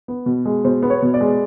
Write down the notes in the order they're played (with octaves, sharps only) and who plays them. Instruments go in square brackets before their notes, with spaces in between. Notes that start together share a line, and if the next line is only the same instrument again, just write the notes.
[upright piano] B3
B2
G#3
B2 C5
B3
C#5
B2
D5
G#3